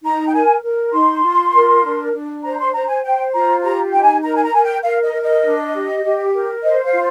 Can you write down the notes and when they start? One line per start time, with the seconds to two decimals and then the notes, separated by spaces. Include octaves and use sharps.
0.03 D#4 A#5
0.28 G5
0.33 A#4 G#5
0.63 A#4
0.93 D#4 C6
1.23 F4
1.53 A#4
1.84 D4
2.13 D4
2.43 C5 A#5
2.58 C6
2.73 C5 A#5
2.88 G#5
3.03 C5 G5
3.33 F4 A#5
3.63 G4 A#5
3.92 D#4 G5
4.03 G#5
4.23 A#4 A#5
4.34 G#5
4.43 A#5
4.53 A#4 G#5
4.63 G5
4.83 A#4 F5
5.03 D#5
5.13 A#4
5.23 D#5
5.43 D4
5.73 G4
6.03 G4
6.33 A#4
6.63 C5 D#5
6.83 F5
6.93 F4